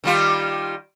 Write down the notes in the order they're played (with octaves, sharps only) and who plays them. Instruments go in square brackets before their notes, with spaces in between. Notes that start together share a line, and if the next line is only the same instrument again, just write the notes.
[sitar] D#3 G3 F4